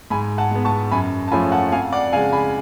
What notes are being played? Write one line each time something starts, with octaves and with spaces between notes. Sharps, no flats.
G#2 G#5 B5
F#5 A5
G#3 B3
A5 C#6
F#2 G#5 B5
A5
F3 A3 C#4 F4 G#5 B5
F#5 A5
F2 F5 G#5
D5 F#5
C#3 G#3 F5 G#5
G#5 B5